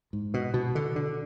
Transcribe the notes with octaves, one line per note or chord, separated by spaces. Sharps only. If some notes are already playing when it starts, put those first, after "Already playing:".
G#2
B2
B2
D3
D3